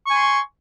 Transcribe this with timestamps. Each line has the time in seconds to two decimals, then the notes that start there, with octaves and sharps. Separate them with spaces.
0.07 C#6
0.11 G#5
0.14 C6